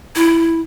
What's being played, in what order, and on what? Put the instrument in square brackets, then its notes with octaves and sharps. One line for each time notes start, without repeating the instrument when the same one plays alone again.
[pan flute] E4